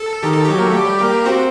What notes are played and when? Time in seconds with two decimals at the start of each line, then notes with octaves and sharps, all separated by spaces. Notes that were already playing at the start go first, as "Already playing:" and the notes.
Already playing: A4
0.23 D#3 G4
0.34 A4
0.45 F#3 G4
0.58 A#3
0.67 A3
0.74 G3
1.01 A#3
1.25 C4 F#4